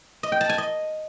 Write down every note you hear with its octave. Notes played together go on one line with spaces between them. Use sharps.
D#5
G5
A5
G#5
D#5